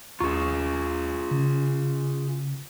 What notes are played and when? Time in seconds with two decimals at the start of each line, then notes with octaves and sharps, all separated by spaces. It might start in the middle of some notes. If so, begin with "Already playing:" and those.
0.20 D#2 F4 G#4 A#5 C#6
1.31 C#3